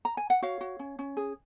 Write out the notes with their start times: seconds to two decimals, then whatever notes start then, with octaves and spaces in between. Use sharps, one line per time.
0.05 A#5
0.17 G#5
0.30 F#5
0.42 F#4 C#5 F5
0.61 F#4
0.79 C#4
0.99 C#4
1.17 G#4